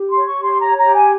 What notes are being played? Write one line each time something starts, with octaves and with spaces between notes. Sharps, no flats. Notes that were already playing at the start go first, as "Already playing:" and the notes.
Already playing: G4
C6
C#5
C#6
G4 C6
C#5 A#5
G4 A#5
G#5